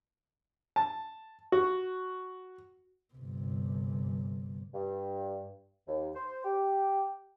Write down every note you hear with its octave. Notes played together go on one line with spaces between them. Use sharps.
A5
F#4
G1 C3
G2
D#2
C5
G4